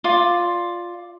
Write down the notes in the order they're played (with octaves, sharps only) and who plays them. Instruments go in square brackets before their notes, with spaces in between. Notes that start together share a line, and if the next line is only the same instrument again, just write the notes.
[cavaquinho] F4 D5